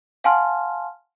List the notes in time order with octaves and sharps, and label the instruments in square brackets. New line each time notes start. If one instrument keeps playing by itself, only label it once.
[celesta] F5 F#5 G#5 A5 C6 F6